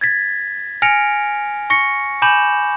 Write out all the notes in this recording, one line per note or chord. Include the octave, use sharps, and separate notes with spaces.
G#6 A6 B6
G#5 F6 A#6 C#7 D7 F7
C#6 A#6 C#7
G#5 B5 D6 G6 E7 F#7